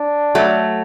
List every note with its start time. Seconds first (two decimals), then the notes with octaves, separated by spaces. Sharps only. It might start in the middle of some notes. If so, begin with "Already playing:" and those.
Already playing: D4
0.35 F#3 A3